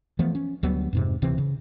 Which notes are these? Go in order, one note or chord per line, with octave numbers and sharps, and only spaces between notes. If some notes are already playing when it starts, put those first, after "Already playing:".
E3 F3 A3 B3
C#4
D2 F#3 G3 B3
F2 G#2 C3
D1 C3 E3 C4
C#3